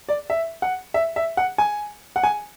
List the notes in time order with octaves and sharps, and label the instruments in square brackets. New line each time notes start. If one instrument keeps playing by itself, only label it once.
[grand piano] D5
E5
F#5
E5
E5
F#5
G#5
F#5
G#5